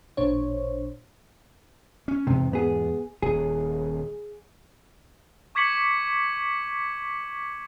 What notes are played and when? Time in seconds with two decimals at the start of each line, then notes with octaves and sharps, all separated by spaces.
0.17 A1 A#2 D4 C5 C#5
2.08 C#4
2.27 E2 G#2 C3
2.53 B3 G#4
3.22 D#1 G#4
5.55 C#6 D6 G#6 B6 C#7 F#7